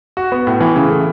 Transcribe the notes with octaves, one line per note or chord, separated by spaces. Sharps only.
F#4
B3
A2
E3
C#3
A3